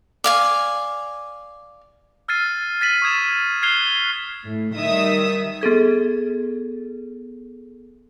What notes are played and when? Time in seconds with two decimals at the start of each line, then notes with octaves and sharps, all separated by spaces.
0.24 D5 F5 G#5
2.28 E6 F6 G#6 A6 C7 D#7
2.81 A6 B6 D#7 F#7
3.02 C#6 D#6 G#6 E7
3.62 F6 F#6 G#6 C7 F7 G7
4.45 A2
4.76 D#3 G3 E5 D#6
5.61 B3 G#4 A4 G#6